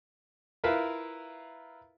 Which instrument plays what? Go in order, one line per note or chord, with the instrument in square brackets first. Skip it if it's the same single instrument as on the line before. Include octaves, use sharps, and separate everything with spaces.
[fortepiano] E4 F4 A#4 B4 E5 F5